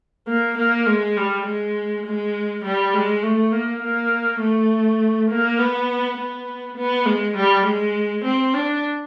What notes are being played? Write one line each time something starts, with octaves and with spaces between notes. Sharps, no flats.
A#3
A#3
G#3
G3
G#3
G#3
G3
G#3
A3
A#3
A#3
A3
A#3
B3
B3
B3
G#3
G3
G#3
C4
D4